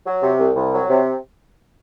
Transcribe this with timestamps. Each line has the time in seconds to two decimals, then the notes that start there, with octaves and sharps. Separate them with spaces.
0.06 F#3
0.22 C3
0.39 C2
0.56 C2
0.73 F#3
0.90 C3